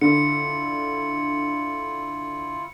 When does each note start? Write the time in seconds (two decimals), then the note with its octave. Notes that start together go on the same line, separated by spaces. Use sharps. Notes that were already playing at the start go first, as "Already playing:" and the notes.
0.01 D3 E4 F4 C#7